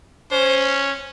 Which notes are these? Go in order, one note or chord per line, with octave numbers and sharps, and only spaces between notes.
C#4 C5